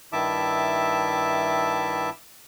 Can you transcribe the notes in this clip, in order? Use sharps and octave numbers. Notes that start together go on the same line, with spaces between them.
G2 D#3 E4 E5 A5 D6